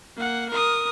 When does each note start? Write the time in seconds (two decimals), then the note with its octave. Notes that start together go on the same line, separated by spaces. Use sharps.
0.16 A#3 F#5
0.50 A#4 D#6